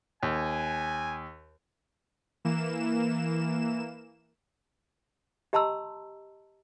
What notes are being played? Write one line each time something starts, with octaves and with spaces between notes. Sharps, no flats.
D#2 G#5
E3 A#3 E7
G4 D#5 A5 A#5 C6 E6